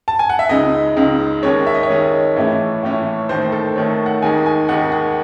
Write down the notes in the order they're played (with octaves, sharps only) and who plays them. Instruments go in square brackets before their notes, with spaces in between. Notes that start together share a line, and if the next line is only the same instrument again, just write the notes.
[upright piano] A5
G#5
F#5
E5
C#2 C#3 G#3 D#4 D#5
C#2 C#3 G#3 D#4
D#2 D#3 G#3 C#4 C#5
E5
D#5
C#5
D#2 D#3 G#3 C#4 D#5
A2 E3 A3 C#4 E4
A2 E3 A3 C#4 E4
D#2 D#3 A3 C5
C5
A4
D#2 D#3 A3 C#5
F#5
D#2 D#3 G#3 D#4 G#5
G#5
D#2 D#3 G#3 D#4 F#5
F#5